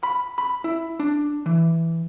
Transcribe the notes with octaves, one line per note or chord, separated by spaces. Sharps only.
B5
B5
E4
D4
E3